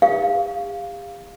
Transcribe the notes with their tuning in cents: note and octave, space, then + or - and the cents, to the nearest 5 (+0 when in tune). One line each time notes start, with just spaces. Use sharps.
G4 +45 F5 +0